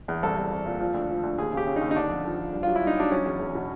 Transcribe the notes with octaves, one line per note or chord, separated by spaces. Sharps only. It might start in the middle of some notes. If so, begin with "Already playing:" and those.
E2
C2 A4
C2
C2
A#2
F3
D2
F3
D2
D#2 G#4
C#3 G4
C#3
D#2 D#4
D#4
D3 D4
F2
F3
F3
G2
F#3 F4
E4
G2
D#4
F#3 D4
F#3 C#4
E2
E2
B2